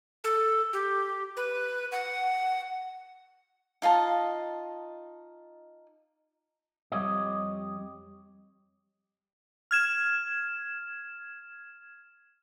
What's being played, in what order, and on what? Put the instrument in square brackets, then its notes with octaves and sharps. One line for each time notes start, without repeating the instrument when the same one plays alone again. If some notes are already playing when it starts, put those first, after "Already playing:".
[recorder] A4
G4
B4
F#5
[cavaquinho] D#4 F4 D#5 A5
[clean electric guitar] F2 G3 G4 C#5 D#5
[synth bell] F6 G#6 E7